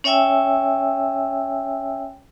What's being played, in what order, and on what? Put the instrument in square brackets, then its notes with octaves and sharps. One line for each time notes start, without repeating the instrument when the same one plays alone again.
[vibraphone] C#4 C#5 E5 G5 G#5 E6